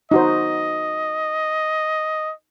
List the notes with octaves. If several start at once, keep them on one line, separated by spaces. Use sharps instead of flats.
D#4 F#4 C5 D#5